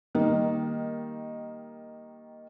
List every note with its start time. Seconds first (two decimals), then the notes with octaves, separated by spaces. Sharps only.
0.15 D#3 G3 A#3 D#4